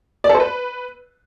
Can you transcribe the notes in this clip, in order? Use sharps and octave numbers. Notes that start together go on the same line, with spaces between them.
D5
A4
C5
B4